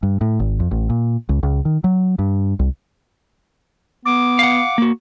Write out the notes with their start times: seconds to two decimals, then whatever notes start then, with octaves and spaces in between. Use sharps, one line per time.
0.03 G2
0.21 A2
0.40 G#1
0.60 F2
0.71 A1
0.90 A#2
1.29 C#2
1.43 C#2
1.65 D#3
1.84 F#3
2.19 G2
2.59 C2
4.05 B3 D6
4.39 F5 F#5
4.78 A#3 F#4